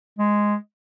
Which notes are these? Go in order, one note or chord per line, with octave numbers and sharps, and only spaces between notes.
G#3